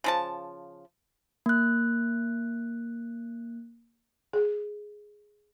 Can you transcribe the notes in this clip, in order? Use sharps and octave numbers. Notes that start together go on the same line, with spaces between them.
C#3 F3 A5
A#3 F#6
G#4